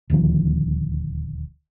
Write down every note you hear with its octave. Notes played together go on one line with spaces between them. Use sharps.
D#1 D2 D#3 F3